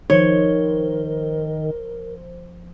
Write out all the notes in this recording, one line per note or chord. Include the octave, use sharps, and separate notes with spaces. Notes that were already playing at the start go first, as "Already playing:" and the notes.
D#3 F3 A#4 C5 C#5